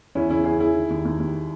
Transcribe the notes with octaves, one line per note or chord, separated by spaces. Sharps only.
E2 C#4 E4
C#3 C#4 E4
E2 E4 G#4
E2 E4 G#4
D#3
D#2
D#2
D#2